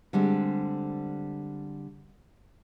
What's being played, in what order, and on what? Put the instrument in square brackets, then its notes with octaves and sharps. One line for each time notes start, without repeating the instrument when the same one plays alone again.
[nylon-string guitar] D3 G3 G#3 C4